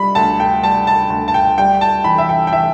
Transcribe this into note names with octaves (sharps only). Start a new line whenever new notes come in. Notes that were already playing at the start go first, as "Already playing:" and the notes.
Already playing: G3 B5
D2 A5
G5
G3 A5
A5
D2
A5
G5
G3 G5
A5
E3 B5
E5
G5
G5
E3 E5